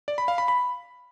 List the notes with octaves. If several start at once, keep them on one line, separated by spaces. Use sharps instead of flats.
D5
B5
F5
B5
B5